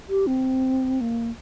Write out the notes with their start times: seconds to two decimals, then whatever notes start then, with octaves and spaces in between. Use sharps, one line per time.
0.09 G4
0.27 C4
1.01 A#3